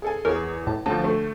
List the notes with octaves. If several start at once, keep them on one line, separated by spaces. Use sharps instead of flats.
G#4 A4 G#5
E2 G#4 A#4 C#5
A2 A5
D2 F3 A5
A3